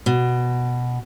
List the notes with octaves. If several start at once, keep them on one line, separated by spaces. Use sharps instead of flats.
B2